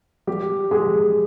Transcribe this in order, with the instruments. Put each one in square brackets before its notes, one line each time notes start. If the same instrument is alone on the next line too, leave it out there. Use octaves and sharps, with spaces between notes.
[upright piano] G3 G4
G#3 G#4